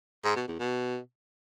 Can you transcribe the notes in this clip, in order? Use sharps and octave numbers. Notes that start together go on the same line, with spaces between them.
G#2
B2
E2
B2